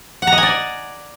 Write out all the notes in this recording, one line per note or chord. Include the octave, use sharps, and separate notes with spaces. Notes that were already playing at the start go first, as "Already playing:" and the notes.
F#5
A#5
D#5
G#5
D5